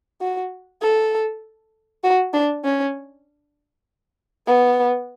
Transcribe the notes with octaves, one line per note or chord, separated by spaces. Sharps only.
F#4
A4
F#4
D4
C#4
B3